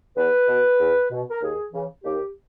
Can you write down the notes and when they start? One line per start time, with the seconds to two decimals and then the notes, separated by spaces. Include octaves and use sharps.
0.17 E2 B4
0.48 B2
0.80 E2
1.11 B2
1.31 A#4
1.41 D#2 G#4
1.73 C#3 E3
2.04 D#2 G4